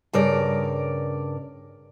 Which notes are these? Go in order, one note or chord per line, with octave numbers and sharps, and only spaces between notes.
G2 C#3 A#4 D5